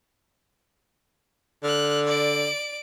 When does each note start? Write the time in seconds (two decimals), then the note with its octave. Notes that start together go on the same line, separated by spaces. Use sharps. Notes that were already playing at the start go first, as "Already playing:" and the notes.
1.64 D3 F6 F#6
2.07 D5 D7